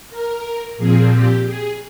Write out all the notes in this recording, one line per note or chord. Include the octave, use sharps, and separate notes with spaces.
A#4
A#2 F3 C4 G#4
G4
G#4